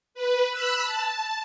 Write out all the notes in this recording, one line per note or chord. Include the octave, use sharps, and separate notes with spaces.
B4
B5 E6 F#6
A5